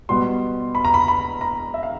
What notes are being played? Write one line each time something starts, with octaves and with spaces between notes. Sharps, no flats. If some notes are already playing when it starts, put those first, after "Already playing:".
B2 G3 B3 C6
B5
A#5
B5
B5
A#5
E5
F5